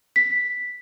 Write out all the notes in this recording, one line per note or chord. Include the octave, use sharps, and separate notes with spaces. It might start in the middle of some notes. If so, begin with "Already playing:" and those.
B6